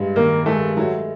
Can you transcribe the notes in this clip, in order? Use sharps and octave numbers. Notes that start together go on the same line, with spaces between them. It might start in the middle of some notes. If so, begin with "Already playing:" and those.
Already playing: G2 G#3
D#3 A#3
G#3 A3
F#3 A3